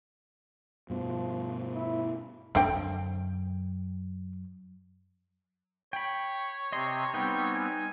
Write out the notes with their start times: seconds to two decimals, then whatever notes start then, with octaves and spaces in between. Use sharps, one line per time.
0.90 G2 B2 F3
1.74 E4
2.55 F#2 D3 C4 G5
5.93 C#5 G5 B5
6.72 C3 C4 D#5 C6
7.14 G3 B3 C4 D#4 B4 G5
7.55 G#5